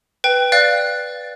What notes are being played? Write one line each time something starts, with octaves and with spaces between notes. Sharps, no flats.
B4 G5
D5 F5 F#6 A6